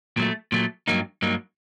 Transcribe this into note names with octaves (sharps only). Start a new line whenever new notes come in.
A#2 F#3 A3
A#2 F#3 A3
G2 F#3 A#3 D#4
G2 F#3 A#3 D#4